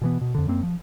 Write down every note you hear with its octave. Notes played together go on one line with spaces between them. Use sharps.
B2 E3 B3
B2
F2 D3
F#2 A#3 C4
F3